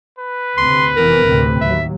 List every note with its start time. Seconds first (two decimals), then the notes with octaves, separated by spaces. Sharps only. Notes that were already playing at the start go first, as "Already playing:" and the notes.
0.19 B4
0.57 D2 C3 C6
0.96 F1 E3 B3 A#4
1.26 D2 A2 C3
1.61 D#2 F#3 E5